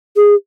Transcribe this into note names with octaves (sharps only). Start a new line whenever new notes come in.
G#4